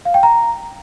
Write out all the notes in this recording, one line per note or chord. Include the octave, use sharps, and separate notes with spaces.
F5
G5
A#5